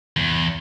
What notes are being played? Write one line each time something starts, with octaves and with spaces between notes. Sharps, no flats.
E2